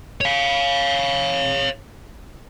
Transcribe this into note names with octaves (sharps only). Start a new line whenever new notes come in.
C#5 F5